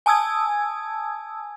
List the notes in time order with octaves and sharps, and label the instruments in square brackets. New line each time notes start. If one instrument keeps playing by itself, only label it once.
[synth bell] G#5 A5 D#6 E6 G#6